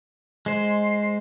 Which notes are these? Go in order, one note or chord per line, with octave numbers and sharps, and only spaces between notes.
G#3 C5